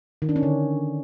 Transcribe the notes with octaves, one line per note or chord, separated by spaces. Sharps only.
D#3
D4
C#4
D3